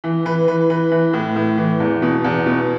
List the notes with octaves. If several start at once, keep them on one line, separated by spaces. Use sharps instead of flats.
E3
E3 B4
E3 B4
E3 B4
E3
A2
A2
E3
E2
B2
E2
B2